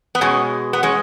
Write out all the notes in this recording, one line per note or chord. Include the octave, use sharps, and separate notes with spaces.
B3
B2 G#3 C#4
B3
G#3 C#4